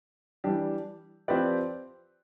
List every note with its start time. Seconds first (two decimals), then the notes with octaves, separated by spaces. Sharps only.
0.44 E3 G3 D4 G4
1.28 F3 C4 G4 B4 D5